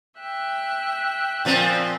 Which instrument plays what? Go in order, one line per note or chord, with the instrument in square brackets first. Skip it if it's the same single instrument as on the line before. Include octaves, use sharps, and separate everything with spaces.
[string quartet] E5 G5 F#6
[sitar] A#2 F3 C4